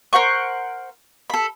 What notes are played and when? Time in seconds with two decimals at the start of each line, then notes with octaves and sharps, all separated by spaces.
0.13 A#4 C5 F#5 C#6
1.30 A4 B5